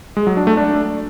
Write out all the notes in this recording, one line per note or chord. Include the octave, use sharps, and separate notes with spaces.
G#3
F#3
D4
A3
D4